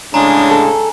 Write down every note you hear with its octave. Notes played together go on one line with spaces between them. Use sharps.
A2 C#3 G#3 D4 G#5 A#5
A4